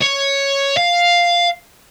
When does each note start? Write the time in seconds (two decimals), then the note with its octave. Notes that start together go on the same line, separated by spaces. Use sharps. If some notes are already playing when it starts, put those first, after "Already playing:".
0.03 C#5
0.77 F5